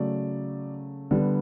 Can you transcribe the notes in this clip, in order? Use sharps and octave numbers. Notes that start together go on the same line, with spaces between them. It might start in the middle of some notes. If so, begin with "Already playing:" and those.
Already playing: C#3 F#3 A3 D5
D3 G3 B3